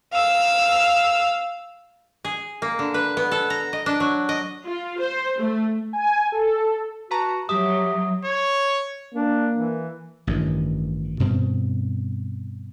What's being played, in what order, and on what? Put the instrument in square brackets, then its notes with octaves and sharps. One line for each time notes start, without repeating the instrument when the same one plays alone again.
[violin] F5 E6
[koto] G#4
A#3
D3
B4
B3
A4
A#5
D#5
D4
F#3
D#5
[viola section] F4
C5
A3
[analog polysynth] G#5
A4
[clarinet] F#4 [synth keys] B4 A5 A#5
[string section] F#3 [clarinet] G4 [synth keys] E5 [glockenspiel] D#6
[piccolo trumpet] C#5
[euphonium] A#3 [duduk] D4
[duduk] E3
[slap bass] A1 G2 D#3
G2 B2 C4